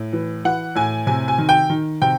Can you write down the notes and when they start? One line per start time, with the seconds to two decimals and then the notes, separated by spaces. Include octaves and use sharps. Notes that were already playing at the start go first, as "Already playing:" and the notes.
Already playing: A2
0.13 E3
0.45 E3 F#5
0.75 A2 G#5
1.07 C3 G#5
1.28 G#5
1.38 D#3
1.49 G5
1.70 D#3
2.02 C3 G5